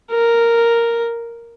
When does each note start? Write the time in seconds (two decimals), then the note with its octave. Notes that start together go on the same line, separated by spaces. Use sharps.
0.11 A#4